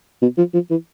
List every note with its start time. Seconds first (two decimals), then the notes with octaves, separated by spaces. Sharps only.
0.22 B2
0.38 F3
0.54 F3
0.71 E3